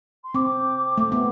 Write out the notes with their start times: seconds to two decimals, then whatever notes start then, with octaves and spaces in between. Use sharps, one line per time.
0.24 C6
0.34 C4 D6
0.98 A3
1.12 B3